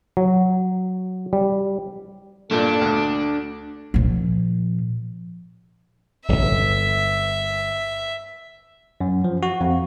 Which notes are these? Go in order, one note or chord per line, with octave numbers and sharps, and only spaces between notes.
F#3
G3
G2 A#2 D4 A4
D2
A#2 F3
D1 G1 E5
F#2
F3
F#4
F2